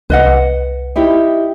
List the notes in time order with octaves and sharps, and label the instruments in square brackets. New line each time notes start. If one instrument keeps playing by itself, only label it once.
[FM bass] C2 [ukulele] B4 D#5 F#5
[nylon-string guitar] D#4 E4 G4